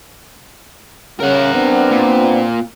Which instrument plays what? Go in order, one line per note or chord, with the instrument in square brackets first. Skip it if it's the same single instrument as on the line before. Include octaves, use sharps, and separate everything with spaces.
[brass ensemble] C#3 [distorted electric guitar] A#4 F#5
[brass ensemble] B3 C4 D4
[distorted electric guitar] A#2